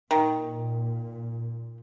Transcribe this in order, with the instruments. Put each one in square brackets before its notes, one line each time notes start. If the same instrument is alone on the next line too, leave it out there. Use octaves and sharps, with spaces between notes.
[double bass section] A#2 [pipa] D#3